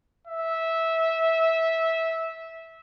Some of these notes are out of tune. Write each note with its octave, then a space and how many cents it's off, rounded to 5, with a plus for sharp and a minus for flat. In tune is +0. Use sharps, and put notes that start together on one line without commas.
E5 -15